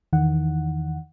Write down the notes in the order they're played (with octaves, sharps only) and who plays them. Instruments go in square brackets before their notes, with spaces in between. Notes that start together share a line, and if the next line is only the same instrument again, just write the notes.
[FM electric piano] E2 D#3 E3 F#5